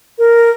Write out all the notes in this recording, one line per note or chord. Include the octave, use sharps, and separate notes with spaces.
A#4